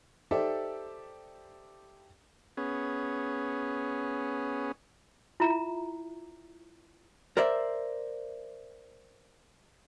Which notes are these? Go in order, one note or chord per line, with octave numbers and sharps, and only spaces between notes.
D#4 G4 A4 C5 D5 E5
B3 C#4 G#4
E4 F4 E5 A#5
A#4 C5 D5 E5